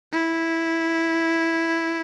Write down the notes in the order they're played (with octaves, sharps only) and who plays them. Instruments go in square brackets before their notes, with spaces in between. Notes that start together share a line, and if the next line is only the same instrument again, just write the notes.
[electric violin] E4